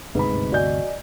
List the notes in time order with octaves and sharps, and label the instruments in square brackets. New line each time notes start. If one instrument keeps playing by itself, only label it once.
[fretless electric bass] G1 D2 C3 [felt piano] G#2 B5 [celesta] B4
[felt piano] F#4 G6 [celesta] D5 D#5 G#5